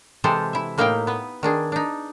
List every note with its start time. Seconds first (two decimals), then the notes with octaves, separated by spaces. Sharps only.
0.24 C3 E3 G#3 G4 A4 C5
0.53 E4 E5
0.78 A2 A#3 D#4 E4 F5 G5
1.07 B3 B4
1.43 D#3 D4 G#4
1.72 D4 D#4